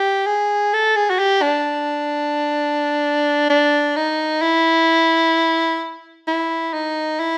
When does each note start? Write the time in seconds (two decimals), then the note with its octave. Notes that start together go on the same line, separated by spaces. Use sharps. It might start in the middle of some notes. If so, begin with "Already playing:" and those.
Already playing: G4
0.27 G#4
0.74 A4
0.96 G#4
1.10 F#4
1.19 G4
1.42 D4
3.50 D4
3.96 D#4
4.42 E4
6.28 E4
6.73 D#4
7.20 E4